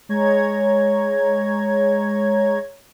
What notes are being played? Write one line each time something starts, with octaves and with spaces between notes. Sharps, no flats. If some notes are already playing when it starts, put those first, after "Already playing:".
G#3 C#5 A#5 G#6